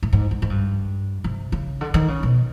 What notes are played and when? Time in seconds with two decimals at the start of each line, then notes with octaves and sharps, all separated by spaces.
0.03 A2
0.13 G#2
0.31 G#2
0.42 G#2
0.50 G2
1.24 C3
1.52 C#3
1.81 D3
1.94 D#3
2.08 C#3
2.23 B2